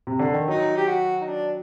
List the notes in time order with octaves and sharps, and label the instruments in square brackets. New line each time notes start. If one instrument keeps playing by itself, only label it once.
[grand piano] C3
D3
D#3
[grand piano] F#3 [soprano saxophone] D#4
[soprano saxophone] G4
F#4
D#4
D4